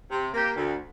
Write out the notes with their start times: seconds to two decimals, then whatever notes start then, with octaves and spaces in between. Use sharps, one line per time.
0.10 C3
0.33 A#3 G4
0.56 D2